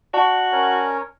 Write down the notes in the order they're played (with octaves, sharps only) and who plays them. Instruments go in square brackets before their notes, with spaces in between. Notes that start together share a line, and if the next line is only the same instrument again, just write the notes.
[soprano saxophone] F#4 [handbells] D5 A5 C#6
[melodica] C#4 A#4 C#5